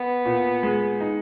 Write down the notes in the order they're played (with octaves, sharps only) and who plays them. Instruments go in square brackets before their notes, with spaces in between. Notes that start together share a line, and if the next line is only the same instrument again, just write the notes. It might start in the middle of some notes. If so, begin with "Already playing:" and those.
Already playing: [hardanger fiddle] B3
[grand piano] A#2
G#3
D#4